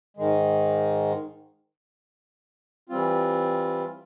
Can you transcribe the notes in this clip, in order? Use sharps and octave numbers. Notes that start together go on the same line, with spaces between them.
G#2 D#3 G#3
E3 G3 C4 F4